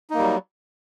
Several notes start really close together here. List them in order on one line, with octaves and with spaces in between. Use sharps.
D#4 A#3 G3 F#3